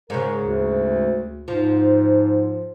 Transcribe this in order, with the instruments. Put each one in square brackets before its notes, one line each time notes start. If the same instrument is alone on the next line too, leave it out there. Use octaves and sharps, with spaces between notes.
[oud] G#2 C#3 [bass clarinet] A#4
[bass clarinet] D2
[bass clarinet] G#2 [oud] F3